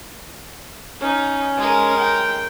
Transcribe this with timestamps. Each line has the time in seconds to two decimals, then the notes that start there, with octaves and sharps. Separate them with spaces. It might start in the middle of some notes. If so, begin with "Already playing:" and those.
1.01 C#4 D#4
1.57 G#3 A#4
1.98 G5